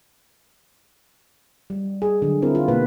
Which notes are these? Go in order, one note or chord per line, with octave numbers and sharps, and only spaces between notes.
G3
G#4
D3 F#3
C4 E4 A#4
F4
B2 A#3 B4